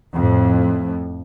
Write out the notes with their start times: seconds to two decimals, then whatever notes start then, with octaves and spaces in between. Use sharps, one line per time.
0.14 F2 A2